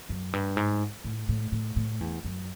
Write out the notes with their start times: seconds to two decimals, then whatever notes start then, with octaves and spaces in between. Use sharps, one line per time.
0.09 F#2
0.33 G2
0.57 G#2
1.04 A2
1.29 A2
1.52 A2
1.76 A2
2.01 E2
2.25 F#2